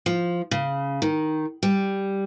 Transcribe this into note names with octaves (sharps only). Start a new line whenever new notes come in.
F3
C#3
D#3
G3